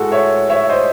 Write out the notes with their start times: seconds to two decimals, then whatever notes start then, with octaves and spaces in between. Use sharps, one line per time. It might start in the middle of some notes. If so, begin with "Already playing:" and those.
Already playing: A2 G#3 F#4 A4
0.12 C#5 E5
0.49 C#5 E5
0.69 C5 D#5